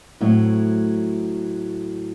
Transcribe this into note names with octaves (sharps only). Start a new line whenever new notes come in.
A2 F#3 A3 C4